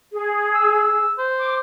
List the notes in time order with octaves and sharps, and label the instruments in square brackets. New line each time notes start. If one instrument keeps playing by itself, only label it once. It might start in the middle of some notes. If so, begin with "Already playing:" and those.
[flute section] G#4
[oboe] E6
E6
C5
[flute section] D6